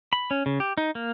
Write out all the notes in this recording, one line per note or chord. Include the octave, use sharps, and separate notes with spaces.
B5
C#4
C#3
G4
D#4
A#3